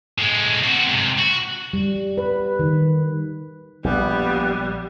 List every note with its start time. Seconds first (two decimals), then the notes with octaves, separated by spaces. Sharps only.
0.18 A2 G#3
0.64 C4 F#4
0.89 G#2 C3
1.19 F#4
1.73 G3
2.18 B4
2.59 D#3
3.84 A#1 G3 B3